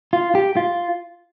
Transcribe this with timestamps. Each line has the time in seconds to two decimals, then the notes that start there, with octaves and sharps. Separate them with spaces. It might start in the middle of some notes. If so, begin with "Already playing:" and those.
0.13 F4
0.35 G4
0.57 F4